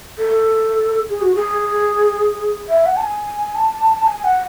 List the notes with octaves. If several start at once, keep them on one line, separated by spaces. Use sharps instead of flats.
A4
G#4
F#4
G#4
E5
F#5
A5
G#5
A5
G#5
F#5